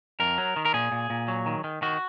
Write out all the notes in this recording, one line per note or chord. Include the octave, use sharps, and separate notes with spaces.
F2 A#4
F#3
D#3
A#4
A#2 G#4
A#2
A#2
F#3
D#3
D#3
D#3 F#4